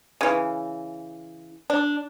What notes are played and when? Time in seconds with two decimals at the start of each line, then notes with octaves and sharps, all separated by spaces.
0.21 C#3 E3
1.70 D4